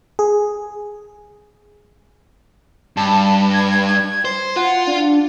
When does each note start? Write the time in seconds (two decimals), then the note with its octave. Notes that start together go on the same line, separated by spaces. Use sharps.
0.19 G#4
2.97 G2 A5
3.54 G#6
4.25 C5
4.56 F4 F#5
4.87 D4